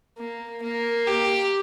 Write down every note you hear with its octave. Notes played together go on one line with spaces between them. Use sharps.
A#3
A#3
G4